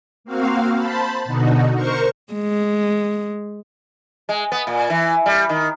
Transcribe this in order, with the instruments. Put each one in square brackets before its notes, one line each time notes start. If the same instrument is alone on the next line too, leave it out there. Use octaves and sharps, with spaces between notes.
[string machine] A#3 C4 F#4 F5
C5 A5 B5
B2 D3 D#4 F#4
A#4 C5 C#6
[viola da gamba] G#3
[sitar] G#3
B3
A#2
E3
G3
D#3